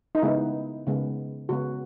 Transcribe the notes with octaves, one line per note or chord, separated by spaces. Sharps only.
D#4
C#3 G#3 B3 E4
C#3 G#3 B3
C#3 G#3 B3 F#4